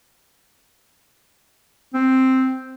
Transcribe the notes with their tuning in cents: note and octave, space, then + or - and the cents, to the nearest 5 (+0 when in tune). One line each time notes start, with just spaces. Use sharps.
C4 +0